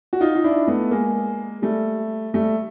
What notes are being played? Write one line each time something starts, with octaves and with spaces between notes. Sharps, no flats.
F#4
D#4 F4
F4
D4 E4
A3 B3
G#3 A#3
G3 A3
G3 A3